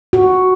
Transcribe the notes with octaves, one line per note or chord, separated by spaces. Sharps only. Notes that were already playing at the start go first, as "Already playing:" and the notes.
F#4